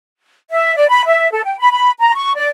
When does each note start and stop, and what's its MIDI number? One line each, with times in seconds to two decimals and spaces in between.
0.50 0.75 76
0.76 0.88 74
0.89 1.01 83
1.07 1.29 76
1.31 1.44 69
1.44 1.55 79
1.59 1.70 83
1.71 1.91 83
2.01 2.12 82
2.14 2.32 85
2.35 2.48 74